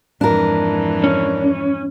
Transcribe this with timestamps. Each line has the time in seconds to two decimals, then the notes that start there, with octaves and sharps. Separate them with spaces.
0.21 F2 G#2 E3 D4 A#4
1.04 C#4